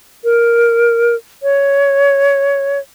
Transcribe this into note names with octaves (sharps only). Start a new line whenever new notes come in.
A#4
C#5